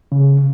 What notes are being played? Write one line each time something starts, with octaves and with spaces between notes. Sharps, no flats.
C#3